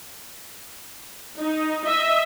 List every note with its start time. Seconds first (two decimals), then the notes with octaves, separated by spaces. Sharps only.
1.40 D#4
1.84 D#5 E5